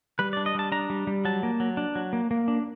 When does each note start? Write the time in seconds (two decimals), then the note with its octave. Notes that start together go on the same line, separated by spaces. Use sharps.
0.19 G3 B4
0.33 D4 D5
0.46 D#5
0.55 G3 A5
0.72 D4 A#5
0.90 G3
1.07 G3
1.25 F#3 A5
1.43 A#3
1.60 F#3
1.77 D4
1.95 F#3
2.13 A#3
2.31 A#3
2.48 D4